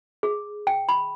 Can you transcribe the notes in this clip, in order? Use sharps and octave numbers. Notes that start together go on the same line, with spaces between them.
G#4
G5
B5